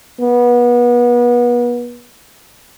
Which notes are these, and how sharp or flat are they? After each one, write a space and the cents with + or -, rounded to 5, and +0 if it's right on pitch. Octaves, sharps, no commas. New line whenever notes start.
B3 -30